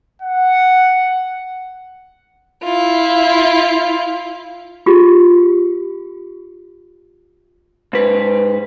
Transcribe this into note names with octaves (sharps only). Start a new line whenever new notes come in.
F#5
E4 F4
F4 G4 G#4
G#2 B4